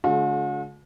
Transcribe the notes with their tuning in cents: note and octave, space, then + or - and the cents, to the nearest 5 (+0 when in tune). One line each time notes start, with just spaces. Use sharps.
D3 -45 G#3 +40 F#4 -45